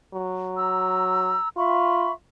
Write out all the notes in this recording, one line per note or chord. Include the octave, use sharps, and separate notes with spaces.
F#3
A#5 E6
F4 E5 B5 C#6